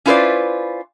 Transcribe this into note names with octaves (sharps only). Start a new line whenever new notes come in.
C#4 E4 F4 B4 C5 D5